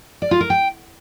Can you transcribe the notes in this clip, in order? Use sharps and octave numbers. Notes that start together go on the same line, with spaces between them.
D5
F4
A#4
G5